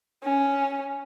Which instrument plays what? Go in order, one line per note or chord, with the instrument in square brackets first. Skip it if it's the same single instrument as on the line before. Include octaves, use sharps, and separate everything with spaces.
[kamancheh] C#4